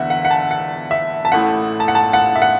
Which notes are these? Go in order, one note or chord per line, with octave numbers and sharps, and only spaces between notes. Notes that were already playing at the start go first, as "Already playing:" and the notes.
Already playing: E2 D3 B3 D4 E5 F#5
F#5
F#5
A5
F#5
E5
A5
A1 A2 A3 E4 F#5
A5
F#5
A5
F#5
E5
F#5